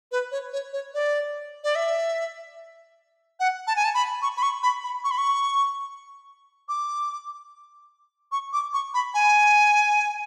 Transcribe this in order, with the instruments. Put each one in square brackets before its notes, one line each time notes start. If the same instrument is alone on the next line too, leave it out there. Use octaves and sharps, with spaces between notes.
[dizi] B4
C#5
C#5
C#5
D5
D5
E5
F#5
A5
G#5
A5
B5
C#6
B5
C#6
B5
B5
C#6
B5
C#6
D6
C#6
D6
C#6
B5
G#5